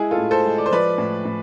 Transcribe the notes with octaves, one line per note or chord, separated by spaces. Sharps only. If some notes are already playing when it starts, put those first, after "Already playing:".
Already playing: G#3 E4 G#4
F4 A4
A2
A4 C5
G#3
D5
C5
F3 B4 D5
A2
A2